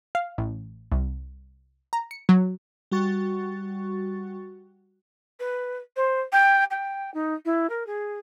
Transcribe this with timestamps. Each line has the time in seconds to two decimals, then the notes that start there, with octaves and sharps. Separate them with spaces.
0.15 F5
0.38 A1
0.92 C2
1.93 A#5
2.11 C#7
2.29 F#3
2.92 G3 F#4 C#6 A6
5.39 B4
5.96 C5
6.32 G5
6.70 G5
7.14 D#4
7.45 E4
7.69 A#4
7.86 G#4